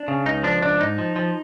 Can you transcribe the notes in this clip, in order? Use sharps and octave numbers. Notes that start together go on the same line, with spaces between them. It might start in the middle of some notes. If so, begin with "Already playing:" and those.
Already playing: D4
C#3
C#2 D#4
F3 D4
C#2 D4
G#2 D#4
F3
F3